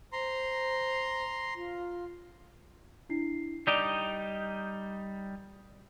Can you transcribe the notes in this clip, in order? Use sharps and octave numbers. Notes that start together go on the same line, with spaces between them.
C5 A#5 C6
F4
D4 E4 C7
G3 D#4 G4 D5